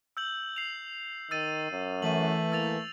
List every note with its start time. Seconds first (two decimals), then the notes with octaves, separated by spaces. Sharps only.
0.17 E6 G6 F#7
0.56 C7 F7
1.31 D#3 E6 A6 D#7
1.72 F#2
2.02 E3 A3 D#7 F#7
2.52 A#3 E6 A6 F7